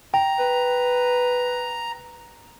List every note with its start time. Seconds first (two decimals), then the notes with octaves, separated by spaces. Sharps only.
0.14 G5 A#5
0.39 B4